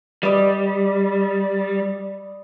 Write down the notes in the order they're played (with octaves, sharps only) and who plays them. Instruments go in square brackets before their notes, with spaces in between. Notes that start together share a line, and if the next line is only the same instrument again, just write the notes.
[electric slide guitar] G3 [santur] B4 D5 D#5